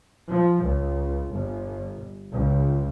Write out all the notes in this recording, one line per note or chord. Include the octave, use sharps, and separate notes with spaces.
F3
C#2
G1
C#2